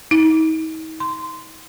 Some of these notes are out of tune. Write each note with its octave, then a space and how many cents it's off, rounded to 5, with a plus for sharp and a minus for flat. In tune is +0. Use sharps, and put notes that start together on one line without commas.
D#4 +40
C6 -15